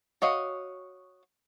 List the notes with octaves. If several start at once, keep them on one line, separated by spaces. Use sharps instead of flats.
F#4 C#5 D#5 F5